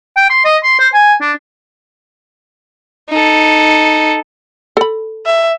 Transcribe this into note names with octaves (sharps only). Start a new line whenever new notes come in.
G5
C6
D#5
C6
C5
G#5
D4
D#4 A4
A4 B5
E5